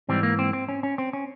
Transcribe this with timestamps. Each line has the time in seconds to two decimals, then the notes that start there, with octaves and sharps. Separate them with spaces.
0.09 G#2 E3 G3 C4
0.23 A#3
0.39 C4
0.53 C4
0.68 C#4
0.83 C#4
0.98 C4
1.13 C#4